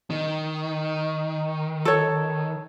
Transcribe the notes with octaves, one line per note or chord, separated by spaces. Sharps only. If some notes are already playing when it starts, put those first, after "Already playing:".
D#3
A4 C#5